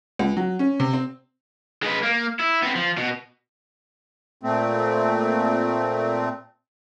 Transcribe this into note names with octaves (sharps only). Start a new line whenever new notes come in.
C#2
F#3
C#4
C3
C4
G#3 B4
A#3
E4
B3 C4
F3
B2
A#2 A3 C4